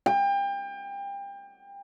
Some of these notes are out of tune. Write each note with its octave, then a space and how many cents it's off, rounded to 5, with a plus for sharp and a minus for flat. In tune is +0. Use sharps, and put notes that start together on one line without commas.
G5 +30